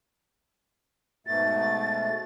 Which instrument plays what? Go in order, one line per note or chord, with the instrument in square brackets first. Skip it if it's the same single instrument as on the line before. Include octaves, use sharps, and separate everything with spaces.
[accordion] G#2 B2 A3 [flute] A6